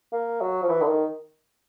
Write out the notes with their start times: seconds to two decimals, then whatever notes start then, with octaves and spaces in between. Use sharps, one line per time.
0.12 A#3
0.41 F#3
0.63 F3
0.69 E3
0.82 D3
0.88 D#3